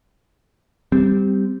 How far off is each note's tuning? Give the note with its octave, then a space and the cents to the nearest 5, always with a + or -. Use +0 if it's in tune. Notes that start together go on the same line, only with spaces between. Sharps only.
G3 +0 C4 -15